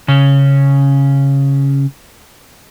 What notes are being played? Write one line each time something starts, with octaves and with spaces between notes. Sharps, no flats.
C#3 C#4